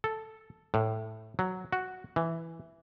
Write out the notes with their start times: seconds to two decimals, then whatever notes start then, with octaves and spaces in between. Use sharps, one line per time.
0.04 A4
0.74 A2
1.39 F#3
1.72 F#4
2.16 E3